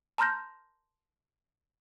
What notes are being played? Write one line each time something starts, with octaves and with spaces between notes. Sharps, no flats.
A5 A#5 C6 F6 G6 A#6